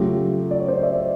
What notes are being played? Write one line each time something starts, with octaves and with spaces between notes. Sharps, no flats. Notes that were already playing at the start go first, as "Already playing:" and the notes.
Already playing: C#3 F#3 A3 F4 G4
D5
C#5
C5 D5
D#5
D5 E5